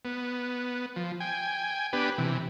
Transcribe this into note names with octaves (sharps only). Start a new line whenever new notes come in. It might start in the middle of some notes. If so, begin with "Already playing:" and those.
B3
F3
G5 G#5
B3 D4 G4 B4
C3 E3